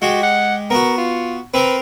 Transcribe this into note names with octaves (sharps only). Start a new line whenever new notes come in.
G#3 F#4 G4
F#5
B3 F#4 A#4
F4
C4 A#4 B4